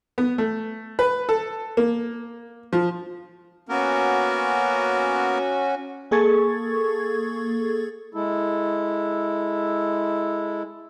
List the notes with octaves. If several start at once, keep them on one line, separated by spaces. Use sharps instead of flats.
B3
A3
B4
A4
A#3
F3
A#3 B3 C#4 F#4 A#4
A#3 G#4 A4 C#6 G#6 A6
G#3 E4 A4